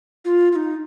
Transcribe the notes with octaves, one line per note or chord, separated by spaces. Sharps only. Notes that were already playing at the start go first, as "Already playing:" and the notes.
F4
F4
D#4